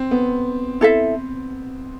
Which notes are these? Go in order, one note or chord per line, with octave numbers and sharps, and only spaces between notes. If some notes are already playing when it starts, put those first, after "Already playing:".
Already playing: C4
B3
E4 A4 E5